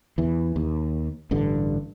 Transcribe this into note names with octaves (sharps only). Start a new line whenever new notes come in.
E2 E3
D#2
A1 G2 D3